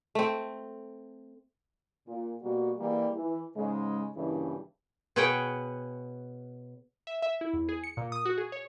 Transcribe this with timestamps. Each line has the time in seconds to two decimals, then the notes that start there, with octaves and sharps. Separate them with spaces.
0.15 A3 C4
2.07 A#2
2.42 B2 G3 A#3 F#4
2.78 E3 G3 A#3 G#4
3.14 E3
3.56 G#2 C#3 G#3
4.16 G2 A#2 C#3 E3
5.16 B2 G#4 B4 C#5 F#5 G5
7.07 E5
7.22 E5
7.41 E4
7.53 E2
7.69 G#4
7.84 C#7
7.97 A#2
8.12 D#6
8.26 F#4
8.38 G#4
8.52 C#5